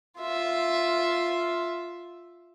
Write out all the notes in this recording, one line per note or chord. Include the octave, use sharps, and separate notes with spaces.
F4 E5